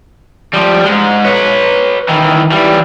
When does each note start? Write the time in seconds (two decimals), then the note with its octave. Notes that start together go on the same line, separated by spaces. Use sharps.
0.54 F3 G3
0.85 G#2 G#3
1.24 B4 C#5
2.09 D#3 E3
2.52 E3 G3